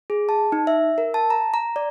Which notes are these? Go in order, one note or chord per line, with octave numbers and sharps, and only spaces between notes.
G#4
A5
D#4
E5
A#4
A5
A#5
A#5
D5